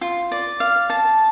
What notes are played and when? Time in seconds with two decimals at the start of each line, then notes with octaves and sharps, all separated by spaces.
0.01 F4
0.32 D5
0.60 F5
0.90 A5